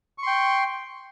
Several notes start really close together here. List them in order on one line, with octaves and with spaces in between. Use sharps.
C#6 C6 G5